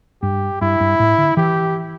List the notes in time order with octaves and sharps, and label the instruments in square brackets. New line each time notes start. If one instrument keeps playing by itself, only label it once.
[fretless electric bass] G2 [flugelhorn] G4
[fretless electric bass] G2 [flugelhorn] E4
[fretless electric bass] G2
A2
D3
[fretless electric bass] E3 [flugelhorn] G4